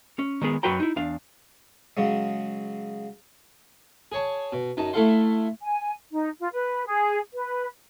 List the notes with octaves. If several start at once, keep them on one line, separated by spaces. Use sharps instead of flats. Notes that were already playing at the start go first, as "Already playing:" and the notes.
C#4
D#3 G#3 B3 G#4
F#2 F#3 F#4 B4 G5 A#5
D#4 E4
E2 D4 F5
C#3 F#3 G#3
G#4 C#5 A5
B2
F#2 D#4 A5
A3 E4 A4 F5 F#5 C6
G#5
D#4
F4
B4
G#4
B4